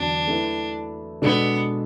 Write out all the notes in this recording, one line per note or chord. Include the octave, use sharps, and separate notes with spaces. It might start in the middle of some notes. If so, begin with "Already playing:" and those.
Already playing: E2 D3 F#3 B3 D4 F#4
A3 E4 B4
B2 G#3 B3 D4 A4